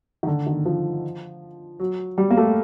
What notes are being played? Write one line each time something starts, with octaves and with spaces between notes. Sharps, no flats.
D#3
D3
D#3
F3
F#3
G3
A#3
A3